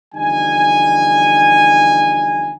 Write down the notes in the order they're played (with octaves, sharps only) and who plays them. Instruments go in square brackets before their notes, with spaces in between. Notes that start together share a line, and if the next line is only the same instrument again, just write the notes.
[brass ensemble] E2 D3 F3 G3 D#4 G#5